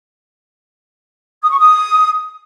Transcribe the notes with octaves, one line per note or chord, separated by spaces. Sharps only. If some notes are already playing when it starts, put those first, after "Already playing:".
D#6
C#6
D#6